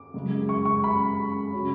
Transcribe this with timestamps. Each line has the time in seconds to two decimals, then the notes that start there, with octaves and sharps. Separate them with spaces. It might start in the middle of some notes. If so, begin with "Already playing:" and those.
Already playing: D6
0.14 F#2 C#3 G#3
0.49 C#6
0.65 C#6
0.84 B5
1.53 C#3 F#3 C#4